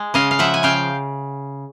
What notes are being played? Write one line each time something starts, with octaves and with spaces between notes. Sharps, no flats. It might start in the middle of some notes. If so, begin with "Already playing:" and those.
Already playing: G#3
C#3 D#5 F5
F5
F3 E5 F#5
G#5
C#3 F5 G5